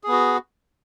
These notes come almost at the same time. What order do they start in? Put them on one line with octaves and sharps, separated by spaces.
G#4 B3 F#4